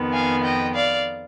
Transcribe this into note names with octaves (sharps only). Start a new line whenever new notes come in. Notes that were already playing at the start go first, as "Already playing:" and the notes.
Already playing: F2 D#3 B3
F5 G#5
D#5 G5
D5 F5